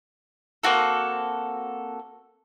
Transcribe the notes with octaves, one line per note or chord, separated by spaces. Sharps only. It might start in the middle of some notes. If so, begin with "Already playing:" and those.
A#3 C4 F#4 A4